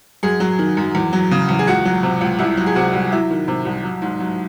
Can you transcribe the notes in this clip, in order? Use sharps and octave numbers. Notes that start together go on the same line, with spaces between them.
F#2 G#4
F#3
D#3
F#2
E2
F#3
C#3
E2
G#4
C#2 F#4
F#3
C3
C#2
C2 E4
F#3
G#4
C3 F#4
C2
F#3 E4
D#3
C3
C2
F#3
G#2
F#3